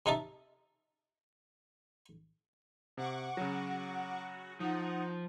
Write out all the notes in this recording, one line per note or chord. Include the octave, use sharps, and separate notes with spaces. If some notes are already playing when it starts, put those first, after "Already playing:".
C3 D#4 E5 A5
C3 F#5 C#6 D6
C#3 F#3 F#4
F3 D#4 F#5